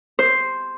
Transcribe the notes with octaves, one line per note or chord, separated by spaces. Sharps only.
C5